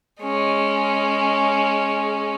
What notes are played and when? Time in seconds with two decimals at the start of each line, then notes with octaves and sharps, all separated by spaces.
0.22 G#3 C#4